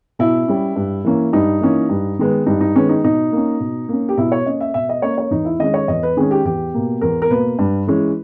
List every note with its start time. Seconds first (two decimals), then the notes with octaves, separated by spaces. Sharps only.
0.19 B2 E4
0.48 G3 C#4
0.76 G2
1.05 E3 A#3 C#4
1.33 G2 D#4
1.61 E3 A#3 C#4
1.90 G2
2.19 D#3 G#3 B3
2.46 G2 D#4
2.61 D#4
2.75 D#3 G#3 B3 C#4
2.89 D#4
3.04 B2 D#4
3.32 A#3 C#4
3.60 B2
3.89 A#3 C#4
4.09 G4
4.18 B2 E4
4.32 C#5
4.45 A#3 C#4 D#5
4.61 E5
4.74 B2 E5
4.89 D#5
5.02 A#3 C#4 C#5
5.18 C#5
5.31 E2 D#4
5.45 E4
5.59 D#3 G#3 C#4 D#5
5.74 C#5
5.88 E2 D#5
6.03 B4
6.17 D#3 G#3 C#4 G#4
6.31 G4
6.45 E2 G4
6.74 B2 A#3
7.01 E2 A#4
7.22 A#4
7.30 B2 A#3 B4
7.59 G2
7.87 E3 G#3 C#4